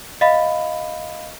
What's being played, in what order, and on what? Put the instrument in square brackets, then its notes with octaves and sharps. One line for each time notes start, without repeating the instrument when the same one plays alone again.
[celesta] D#5 F5 B5